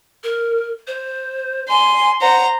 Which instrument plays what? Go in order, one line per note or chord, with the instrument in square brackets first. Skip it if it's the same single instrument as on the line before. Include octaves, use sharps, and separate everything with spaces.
[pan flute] A#4
C5
[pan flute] G#5 [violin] C6
[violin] C5 A#5 [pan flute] F#5